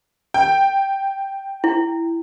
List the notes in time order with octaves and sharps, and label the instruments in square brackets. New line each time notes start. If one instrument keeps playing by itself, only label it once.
[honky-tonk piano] G5
[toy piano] E4